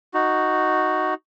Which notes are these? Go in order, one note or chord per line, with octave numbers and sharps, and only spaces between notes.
D#4 F#4